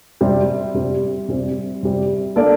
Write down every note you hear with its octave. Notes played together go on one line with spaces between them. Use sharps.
C3 G3 C4
C3 G3 C4
C3 G3 C4
C3 G3 C4
A#3 D4 A4 D5